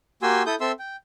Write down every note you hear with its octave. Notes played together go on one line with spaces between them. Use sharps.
A#3 F#4 G4 G#5 C6 E6
E4 A4 D#6 G6
C4 A4 E5 C6 E6
G5